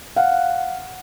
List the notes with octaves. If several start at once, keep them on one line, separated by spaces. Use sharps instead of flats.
F5 F#5